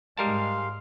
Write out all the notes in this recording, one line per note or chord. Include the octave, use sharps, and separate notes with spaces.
G#2 G3 G#3 A#4 F5 A5 C6